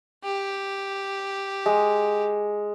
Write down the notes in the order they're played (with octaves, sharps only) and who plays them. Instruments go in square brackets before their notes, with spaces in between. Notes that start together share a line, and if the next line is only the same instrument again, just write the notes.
[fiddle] G4
[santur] G#3